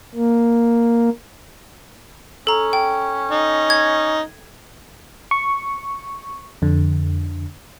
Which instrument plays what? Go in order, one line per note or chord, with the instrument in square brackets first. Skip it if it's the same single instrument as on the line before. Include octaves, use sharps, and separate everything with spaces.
[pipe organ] A#3
[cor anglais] C#4 [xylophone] A4 A#5
[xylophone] G5
[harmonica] D#4
[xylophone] G#6
[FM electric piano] C#6
F2 D3